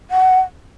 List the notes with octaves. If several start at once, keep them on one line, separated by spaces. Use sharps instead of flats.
F#5